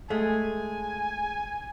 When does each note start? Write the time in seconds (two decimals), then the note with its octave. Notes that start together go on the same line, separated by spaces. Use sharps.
0.10 G#3 A3 G#5